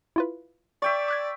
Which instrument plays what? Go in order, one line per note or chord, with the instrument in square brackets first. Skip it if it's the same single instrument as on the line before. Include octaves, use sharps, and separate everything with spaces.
[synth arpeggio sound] E4 F4 B4
[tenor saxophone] D5 [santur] E5 G5 C#6
[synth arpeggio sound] D6 F#6 G#6